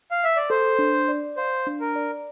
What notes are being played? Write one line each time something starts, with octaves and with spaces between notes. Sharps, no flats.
F5
E5
D5
A4 C5
D4
D5
C5 F5
D4
A#4
D5